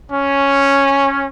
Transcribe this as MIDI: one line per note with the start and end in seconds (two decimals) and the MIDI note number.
0.11 1.27 61